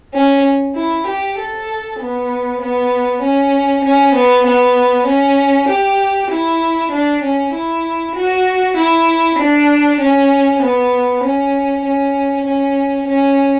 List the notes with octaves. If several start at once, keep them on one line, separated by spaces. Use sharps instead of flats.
C#4
E4
G4
A4
B3
B3
C#4
C#4
B3
B3
C#4
G4
E4
D4
C#4
E4
F#4
E4
D4
C#4
B3
C#4
C#4
C#4
C#4